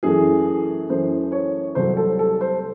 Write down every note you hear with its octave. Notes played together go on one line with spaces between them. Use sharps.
F#2 E3 A3 G#4
F#2 E3 A3 C5
C#5
C2 C3 F#3 A3 C5
A4
A4
C5